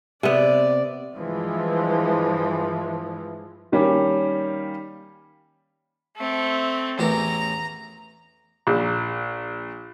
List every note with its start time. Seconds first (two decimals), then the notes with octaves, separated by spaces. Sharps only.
0.23 C3 B3 D5
1.15 G2 E3 F3 G#3
3.72 D#3 G3 A#3 C#4 G4
6.17 A3 C4
6.99 A1 E2 A#4 A#5
8.67 A#1